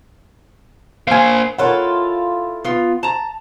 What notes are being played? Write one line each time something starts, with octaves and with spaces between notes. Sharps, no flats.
A#3 C5 F5 G#5
E4 F4 A4 A#4 C#5 F#5
B3 F4
A5 A#5